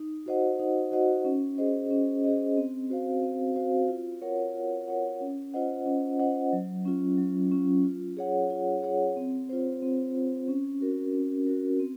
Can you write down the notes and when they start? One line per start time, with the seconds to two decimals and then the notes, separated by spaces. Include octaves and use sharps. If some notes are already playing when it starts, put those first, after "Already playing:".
Already playing: D#4
0.26 F#4 C5 D#5 F#5
0.59 D#4
0.92 F#4 C5 D#5 F#5
1.25 C#4
1.58 G#4 C5 D#5
1.90 C#4
2.24 G#4 C5 D#5
2.57 C4
2.90 F#4 C5 F5
3.23 C4
3.56 F#4 C5 F5
3.89 F4
4.21 A#4 C#5 F#5
4.54 F4
4.88 A#4 C#5 F#5
5.21 C#4
5.54 F4 C5 D#5 F#5
5.86 C#4
6.19 F4 C5 D#5 F#5
6.53 F#3
6.85 C#4 F4
7.18 F#3
7.51 C#4 F4
7.84 F4
8.17 G#4 C#5 F#5
8.50 F4
8.82 G#4 C#5 F#5
9.16 C4
9.49 F4 C5
9.82 C4
10.14 F4 C5
10.48 C#4
10.81 F#4 A#4
11.14 C#4
11.47 F#4 A#4
11.80 C4